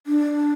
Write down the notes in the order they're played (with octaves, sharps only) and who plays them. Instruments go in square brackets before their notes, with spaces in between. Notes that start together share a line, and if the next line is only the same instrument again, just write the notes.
[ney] D4